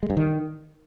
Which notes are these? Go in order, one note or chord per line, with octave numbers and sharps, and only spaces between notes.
G#3
G2
D#3